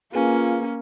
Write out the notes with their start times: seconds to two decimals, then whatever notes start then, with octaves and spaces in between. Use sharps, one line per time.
0.14 A#3 C#4 F4 G#4 B4 G#5